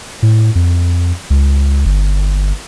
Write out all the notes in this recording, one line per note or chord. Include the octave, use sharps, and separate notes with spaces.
A2
F2
C#2
G1